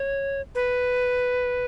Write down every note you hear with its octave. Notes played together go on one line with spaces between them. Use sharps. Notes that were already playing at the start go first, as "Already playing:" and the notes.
Already playing: C#5
B4